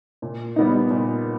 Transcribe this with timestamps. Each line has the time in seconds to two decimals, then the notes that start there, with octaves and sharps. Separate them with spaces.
0.22 A#2
0.56 G3 B3 D#4
0.90 A#2